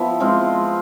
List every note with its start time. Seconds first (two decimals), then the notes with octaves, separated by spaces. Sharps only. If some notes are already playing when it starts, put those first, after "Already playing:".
Already playing: F3 B3 E4
0.20 G#3 C4 F4